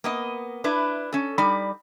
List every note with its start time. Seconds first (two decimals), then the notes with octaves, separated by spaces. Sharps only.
0.04 A#3 B3 D#5
0.64 D4 E4 B4
1.13 C#4 A4
1.38 G3 D#4 D5 B5